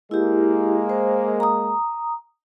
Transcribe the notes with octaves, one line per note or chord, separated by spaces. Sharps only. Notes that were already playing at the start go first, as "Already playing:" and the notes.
G#3 A#3 E4 G4
C5
A#5 D#6